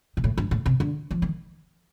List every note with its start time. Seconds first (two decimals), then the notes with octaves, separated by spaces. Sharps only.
0.17 A#2
0.24 A2
0.38 G2
0.51 A2
0.66 C3
0.80 D3
1.11 F3
1.22 D#3